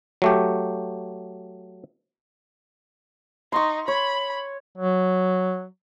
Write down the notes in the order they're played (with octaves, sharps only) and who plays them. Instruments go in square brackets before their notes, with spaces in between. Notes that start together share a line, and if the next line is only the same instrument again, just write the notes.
[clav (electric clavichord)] F#3 A3 G4
[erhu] D#4 [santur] C6 C#6
[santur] C#5 [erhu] B5
[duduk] F#3